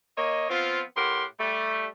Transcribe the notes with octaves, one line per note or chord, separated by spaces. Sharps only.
A#3 C#5 D#5
F3 B3 C4 F4
A2 G4 A#4 F#5 C6
G3 A3